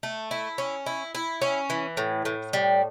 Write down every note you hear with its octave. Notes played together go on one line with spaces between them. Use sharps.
A3
E4
C#4
E4
E4
C#4
E3
A2
A2
G3